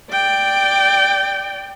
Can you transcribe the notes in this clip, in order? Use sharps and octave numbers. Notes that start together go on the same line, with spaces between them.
D5 G5